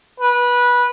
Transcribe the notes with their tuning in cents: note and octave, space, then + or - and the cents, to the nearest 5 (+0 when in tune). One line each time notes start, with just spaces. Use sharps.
B4 -20